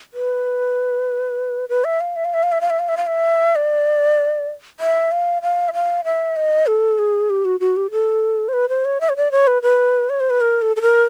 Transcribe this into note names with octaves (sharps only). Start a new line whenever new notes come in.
B4
B4
E5
F5
E5
F5
E5
F5
E5
F5
E5
F5
E5
F5
E5
D5
E5
F5
F5
E5
F5
E5
D#5
A4
G#4
G4
F#4
F#4
G4
A4
C5
B4
C5
C#5
E5
C#5
D5
C#5
B4
B4
C#5
C5
B4
A#4
A4
A4
A#4